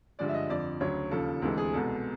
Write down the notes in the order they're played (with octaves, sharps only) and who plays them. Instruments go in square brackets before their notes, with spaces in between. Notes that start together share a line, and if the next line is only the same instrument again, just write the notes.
[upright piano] G2 D3 F3 G#3 D5
E5
D#5
F2 D3 F3 D5
D2 C#3 F#3 C#5
D#2 C#3 F3 A4
D2 C3 E3 G#3 A4
G#4
C2 B2 G#3 A4